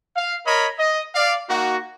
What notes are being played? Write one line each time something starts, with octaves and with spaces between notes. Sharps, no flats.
F5
A#4 C#5 D#5 B5
D#5
D5 F5
A#3 D#4 F#4